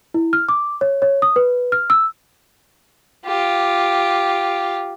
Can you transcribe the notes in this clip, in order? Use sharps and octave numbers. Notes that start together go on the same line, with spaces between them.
E4
F6
D6
C#5
C#5
D#6
B4
F6
E6
F4 G4